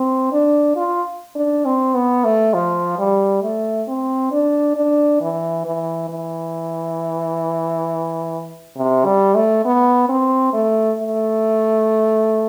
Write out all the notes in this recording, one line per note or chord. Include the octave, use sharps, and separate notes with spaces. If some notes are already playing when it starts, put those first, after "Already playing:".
Already playing: C4
D4
F4
D4
C4
B3
A3
F3
G3
A3
C4
D4
D4
E3
E3
E3
C3
G3
A3
B3
C4
A3
A3